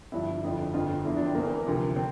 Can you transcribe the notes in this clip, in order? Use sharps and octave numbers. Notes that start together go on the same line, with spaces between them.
G1 G2 F3 E4
G1 F2 D3 F3
G1 F2 D3 F3 F4
E2 D3 F3 E4
D4
C4
E1 E2 E3 A#3
D2 C3 F3
C4